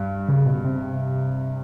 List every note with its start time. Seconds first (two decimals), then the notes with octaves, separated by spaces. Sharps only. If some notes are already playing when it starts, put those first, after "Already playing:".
Already playing: G2
0.28 C#3
0.46 B2
0.64 C3